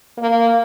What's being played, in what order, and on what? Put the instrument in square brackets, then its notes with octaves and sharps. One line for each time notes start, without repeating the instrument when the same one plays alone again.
[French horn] A#3